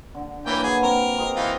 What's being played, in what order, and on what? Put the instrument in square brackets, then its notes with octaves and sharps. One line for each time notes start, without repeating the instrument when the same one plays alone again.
[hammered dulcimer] D3
[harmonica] E3 C#4 G5 [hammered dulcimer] A#3 B4
[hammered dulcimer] F#3 [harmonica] G#4 G#5
[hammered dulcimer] C4 [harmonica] A#4
[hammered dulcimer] C4 G#4 D#5
[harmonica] E3 D#4 F4